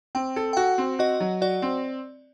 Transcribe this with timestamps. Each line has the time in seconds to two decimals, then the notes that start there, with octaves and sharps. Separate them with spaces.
0.15 C4 G5
0.36 A4
0.53 G5
0.57 F#4 F#5
0.78 C4
0.99 F#4 D#5
1.20 F#3
1.41 F#4 D5
1.62 C4